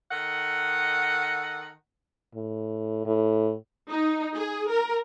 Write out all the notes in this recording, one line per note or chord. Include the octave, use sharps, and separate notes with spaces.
D#3 A4 D#5 F#5
A2
A2
D#4
G#4
A#4